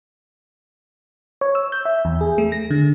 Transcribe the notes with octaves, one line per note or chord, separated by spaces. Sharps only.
C#5
E6
G6
E5
E2
G#4
A3
A#6
D3